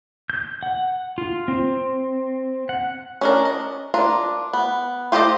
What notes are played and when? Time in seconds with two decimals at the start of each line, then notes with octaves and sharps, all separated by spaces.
0.30 G6
0.63 F#5
1.18 F4
1.48 C4
2.69 F#5
3.21 C#4 D4 A#4
3.45 D#5
3.94 D4 F4 A#4
4.53 B3
5.12 F4 G4 A4 C5 D#5